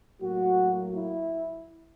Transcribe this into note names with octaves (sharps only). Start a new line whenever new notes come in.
A2 F#3 A#3 F#4
E4